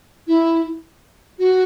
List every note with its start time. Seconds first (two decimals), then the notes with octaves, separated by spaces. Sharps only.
0.27 E4
1.39 F#4